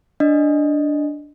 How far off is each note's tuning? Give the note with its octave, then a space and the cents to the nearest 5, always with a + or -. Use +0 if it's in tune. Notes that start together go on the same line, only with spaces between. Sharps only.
D4 +0 D#5 -5